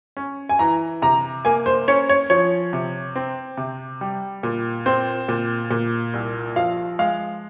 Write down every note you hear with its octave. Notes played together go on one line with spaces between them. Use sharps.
C#4
G#5
E3 A#5
C3 A#5
A#3 G#5
C5
C#4 C#5
C#5
F3 C#5
C3
C4
C3
G3
A#2
C4 C5
A#2
A#2
C2
F3 F5
G#3 F5